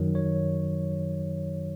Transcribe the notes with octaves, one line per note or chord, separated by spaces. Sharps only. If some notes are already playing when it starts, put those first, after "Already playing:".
Already playing: F#2 D#3 F#3
C#5